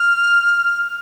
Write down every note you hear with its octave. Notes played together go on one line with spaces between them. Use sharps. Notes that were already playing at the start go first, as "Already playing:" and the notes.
Already playing: F6